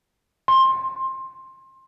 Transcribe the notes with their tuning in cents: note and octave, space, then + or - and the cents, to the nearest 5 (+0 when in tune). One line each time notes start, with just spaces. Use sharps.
C6 +20